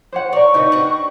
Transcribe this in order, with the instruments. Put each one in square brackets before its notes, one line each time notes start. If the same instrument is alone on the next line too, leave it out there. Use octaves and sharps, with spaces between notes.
[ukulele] C5 C#5 F#5
[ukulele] A#4 C#5 [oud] D5 [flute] C#6
[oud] C#3 C4 [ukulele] D#4 G4 B4
[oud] D4 F#4